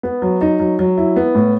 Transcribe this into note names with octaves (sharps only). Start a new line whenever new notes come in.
B3
F#3
D#4
F#3
F#3
E4
B3
A2